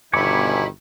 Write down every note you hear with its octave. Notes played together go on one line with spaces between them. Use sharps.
G1 B2 D#3 E4 G#5 B5 C#6 D6